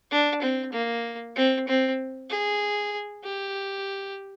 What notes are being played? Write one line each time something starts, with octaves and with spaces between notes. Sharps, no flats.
D4
C4
A#3
C4
C4
G#4
G4